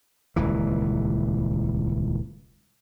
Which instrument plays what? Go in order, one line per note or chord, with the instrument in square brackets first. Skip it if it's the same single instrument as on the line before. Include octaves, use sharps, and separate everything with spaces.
[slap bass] D#1 C#2 E3